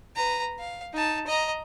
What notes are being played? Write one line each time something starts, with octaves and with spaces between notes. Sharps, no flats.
B4 A#5
F5
D#4 A5
D#5 A#5